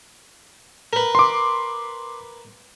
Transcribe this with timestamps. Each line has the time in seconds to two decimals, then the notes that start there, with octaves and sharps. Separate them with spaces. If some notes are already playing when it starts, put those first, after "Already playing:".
0.93 A#4 B4
1.15 C6 D6